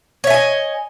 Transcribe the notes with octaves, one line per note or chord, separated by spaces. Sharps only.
C#5 D#5 E5 G#5